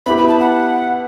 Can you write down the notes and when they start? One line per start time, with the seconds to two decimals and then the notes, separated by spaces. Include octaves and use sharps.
0.06 B3 E4 G4 B5
0.18 B5
0.28 A5
0.40 F#5